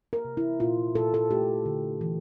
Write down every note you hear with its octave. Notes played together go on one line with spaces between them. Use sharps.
A#4
C3
E4
A#2 F4
A#2 A4
A4
A3 G4
D3
E3